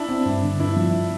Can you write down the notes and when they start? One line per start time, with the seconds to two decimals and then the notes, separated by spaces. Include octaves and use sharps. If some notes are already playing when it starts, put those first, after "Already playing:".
Already playing: D4 E4
0.09 C4
0.25 G2
0.43 D3
0.60 G2 E4
0.76 F3